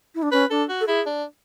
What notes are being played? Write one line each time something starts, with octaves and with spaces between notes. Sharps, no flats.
E4
D4
C#4 B4
D4 A4
F#4
A4
E4 G#4
D4